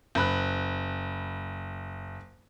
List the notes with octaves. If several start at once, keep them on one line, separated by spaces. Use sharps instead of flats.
F#1 B5 F#6